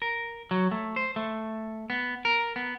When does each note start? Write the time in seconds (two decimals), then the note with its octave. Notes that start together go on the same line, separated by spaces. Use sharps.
0.02 A#4
0.51 F#3
0.71 A3
0.96 C5
1.16 A3
1.90 B3
2.25 A#4
2.56 B3